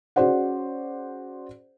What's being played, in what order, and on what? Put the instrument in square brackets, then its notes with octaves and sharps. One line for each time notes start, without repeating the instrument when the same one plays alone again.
[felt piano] C#4 F#4 G#4 C5 D5 F#5